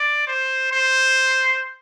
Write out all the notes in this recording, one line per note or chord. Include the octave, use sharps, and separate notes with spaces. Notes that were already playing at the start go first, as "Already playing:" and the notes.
Already playing: D5
C5
C5